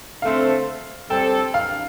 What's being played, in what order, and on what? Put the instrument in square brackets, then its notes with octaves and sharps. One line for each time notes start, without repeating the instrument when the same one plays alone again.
[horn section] D3 A3 C4 A4 C5 [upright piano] F5
[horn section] G3 C4 A4 [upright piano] G5
[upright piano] F5